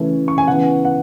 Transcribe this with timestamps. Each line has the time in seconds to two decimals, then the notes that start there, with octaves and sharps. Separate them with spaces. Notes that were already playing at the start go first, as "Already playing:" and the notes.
Already playing: C#3 E3 A3 C#4
0.28 C#6
0.38 G#5
0.47 C#3 E3 B3 F#5
0.85 F#5